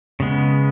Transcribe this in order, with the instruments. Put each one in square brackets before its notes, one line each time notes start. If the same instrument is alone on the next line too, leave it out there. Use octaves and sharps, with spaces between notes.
[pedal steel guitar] C#3 G#3 B3